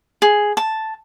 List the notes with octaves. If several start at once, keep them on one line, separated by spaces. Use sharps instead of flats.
G#4
A5